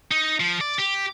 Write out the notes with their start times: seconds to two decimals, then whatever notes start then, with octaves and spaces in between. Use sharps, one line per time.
0.11 D#4
0.40 F3
0.61 D5
0.79 G4